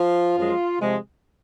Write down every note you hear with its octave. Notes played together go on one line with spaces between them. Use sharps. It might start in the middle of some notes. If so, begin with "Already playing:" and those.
Already playing: F3 F4
F#2 F3 G#3
C3 F3 G#3